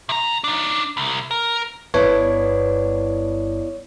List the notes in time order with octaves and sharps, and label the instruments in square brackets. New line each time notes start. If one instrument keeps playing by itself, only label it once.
[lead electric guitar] C3 A#5
D4 D#4
C2
A#4
[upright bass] G1 G2 [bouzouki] B3 D4 E4 [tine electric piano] C#5